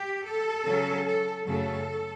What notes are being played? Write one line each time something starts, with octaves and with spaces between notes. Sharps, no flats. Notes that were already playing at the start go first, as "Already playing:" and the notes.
Already playing: G4
A4
C#3 F#3 C#4
A4
F#2 C#3 F#3 A3 C#4 A4